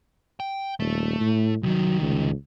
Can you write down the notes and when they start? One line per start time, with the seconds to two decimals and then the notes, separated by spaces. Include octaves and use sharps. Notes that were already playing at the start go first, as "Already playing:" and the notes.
0.40 G5
0.80 D#1 A3
1.20 A2
1.63 C2 D#3 F#3
2.02 C#2